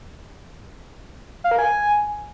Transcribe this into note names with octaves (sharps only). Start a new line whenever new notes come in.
F5
A#4
G#5